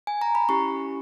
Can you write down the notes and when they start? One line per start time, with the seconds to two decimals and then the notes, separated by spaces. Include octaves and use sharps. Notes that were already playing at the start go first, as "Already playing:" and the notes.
0.07 G#5
0.21 A#5
0.35 B5
0.49 C#4 E4 G4 C#6